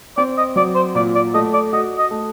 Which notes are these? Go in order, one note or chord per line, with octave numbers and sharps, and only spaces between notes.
C4 D5
D#5
F#3 D5
C5
A#2 D5
D5
A3 D#5
D5
F#4 D#5
D#5
A3